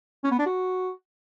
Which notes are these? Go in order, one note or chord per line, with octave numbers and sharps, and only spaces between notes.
C#4
B3
D4
F#4